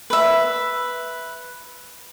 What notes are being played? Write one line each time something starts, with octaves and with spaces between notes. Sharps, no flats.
B4 E5